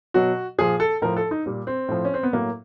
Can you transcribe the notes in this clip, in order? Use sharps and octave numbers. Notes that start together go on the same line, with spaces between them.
B2 F#3 F#4
A#2 F3 G#4
A4
A2 F3 A#4
A4
D#4
A#2 G3
C4
A2 F3
C#4
C4
B3
A2 F#3 A#3